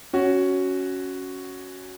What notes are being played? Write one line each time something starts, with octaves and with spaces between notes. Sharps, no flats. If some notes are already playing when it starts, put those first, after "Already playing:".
C#4 F#4